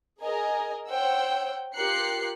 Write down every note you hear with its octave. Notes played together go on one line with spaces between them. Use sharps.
G#4 A#4 D#5 G#5 A#5
C5 C#5 F#5 G5 E6
F4 G4 A#4 F#6 C7 C#7